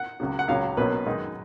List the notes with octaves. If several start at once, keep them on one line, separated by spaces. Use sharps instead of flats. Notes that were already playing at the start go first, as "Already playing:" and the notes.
Already playing: F#5
C#2 C#3 F#3
F#5
C#2 C#3 F#3 C#4 F5
B1 B2 F#3 A#3 C#4 B4
F#2 D#3 G#3 D#4